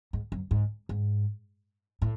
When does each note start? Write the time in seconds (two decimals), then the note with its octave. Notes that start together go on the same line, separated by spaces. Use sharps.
0.13 G#2
0.32 F#2
0.51 G#2
0.89 G#2
2.02 A2